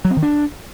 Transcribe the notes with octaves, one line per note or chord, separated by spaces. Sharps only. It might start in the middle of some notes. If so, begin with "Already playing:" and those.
F#3
C4
D#3
D4